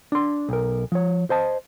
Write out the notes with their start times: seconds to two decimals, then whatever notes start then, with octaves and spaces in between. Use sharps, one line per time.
0.12 D4 C6
0.49 B1 A#4
0.92 F3 C#5
1.30 C5 D#5 A5